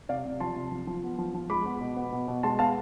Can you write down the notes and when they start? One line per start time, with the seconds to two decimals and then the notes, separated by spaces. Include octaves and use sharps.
0.09 C3 D5 F5
0.25 C3
0.40 F3 A5 C6
0.56 C3
0.72 F3
0.87 F3
1.03 B3
1.18 F3
1.34 F3
1.50 G#3 B5 D6
1.65 B3
1.81 B2
1.96 B3
2.12 B2
2.28 B2
2.43 G#3 A5 C6
2.59 B3 F5 A5